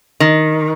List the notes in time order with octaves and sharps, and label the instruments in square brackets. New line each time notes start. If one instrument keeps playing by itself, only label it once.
[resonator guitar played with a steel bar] D#3